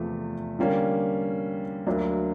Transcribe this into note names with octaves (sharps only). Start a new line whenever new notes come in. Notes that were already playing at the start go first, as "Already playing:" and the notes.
Already playing: E2 C3 F3 A3
D3 G3 A#3 C#4
D2 D3 F#3 A#3 D4